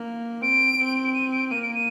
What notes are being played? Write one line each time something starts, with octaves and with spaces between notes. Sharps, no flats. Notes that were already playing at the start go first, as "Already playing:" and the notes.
Already playing: A#3
C4 D7
C4
D7
D#7
D7
A#3 D#7
D7
D#7